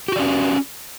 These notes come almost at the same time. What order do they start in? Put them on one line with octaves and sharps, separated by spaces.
G4 F#4 D5 C#4